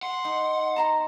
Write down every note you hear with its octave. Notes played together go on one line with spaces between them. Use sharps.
F#5 C6
D#4
A5 A#5 C6